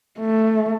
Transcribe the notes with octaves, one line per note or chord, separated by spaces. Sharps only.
A3